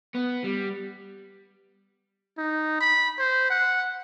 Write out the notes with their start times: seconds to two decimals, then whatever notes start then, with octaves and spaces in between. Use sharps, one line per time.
0.14 B3
0.44 G3
2.38 D#4
2.81 B5
3.19 C5
3.50 F#5